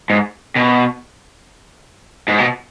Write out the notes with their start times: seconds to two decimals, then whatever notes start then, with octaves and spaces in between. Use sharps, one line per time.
0.10 G#2
0.56 B2
2.28 G#2
2.38 B2